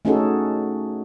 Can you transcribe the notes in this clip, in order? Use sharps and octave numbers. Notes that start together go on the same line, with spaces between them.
A3 C#4 D#4 F#4 G#4 A4